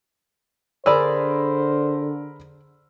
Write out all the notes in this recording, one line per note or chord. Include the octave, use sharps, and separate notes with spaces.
D3 G#4 A#4 C5 D5 B5 E6